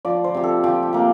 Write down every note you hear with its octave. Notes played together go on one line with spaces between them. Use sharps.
F3 D5
C5
C3 G4
A4
F3 G4
G4
C3 A#3